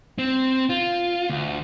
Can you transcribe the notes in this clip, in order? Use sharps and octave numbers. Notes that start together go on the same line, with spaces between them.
C4
F4
D2